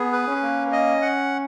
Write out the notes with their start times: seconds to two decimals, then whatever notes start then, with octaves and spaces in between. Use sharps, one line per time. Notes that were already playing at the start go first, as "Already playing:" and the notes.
Already playing: B3 G#4
0.13 B4
0.28 C#4
0.43 A#3
0.72 D#5
1.02 F#5